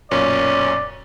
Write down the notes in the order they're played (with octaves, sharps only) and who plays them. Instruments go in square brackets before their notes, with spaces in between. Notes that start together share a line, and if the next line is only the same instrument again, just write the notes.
[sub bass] D1 [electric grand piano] B1 F#2 A#2 [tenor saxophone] C#4 [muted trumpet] D5